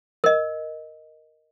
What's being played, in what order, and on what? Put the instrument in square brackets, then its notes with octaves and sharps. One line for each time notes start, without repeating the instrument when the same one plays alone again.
[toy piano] A#4 D#5